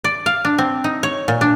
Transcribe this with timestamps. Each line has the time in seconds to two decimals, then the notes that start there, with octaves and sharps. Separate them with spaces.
0.04 D5
0.26 F5
0.45 D4
0.58 C4
0.84 D#4
1.03 C#5
1.28 A#2
1.41 D4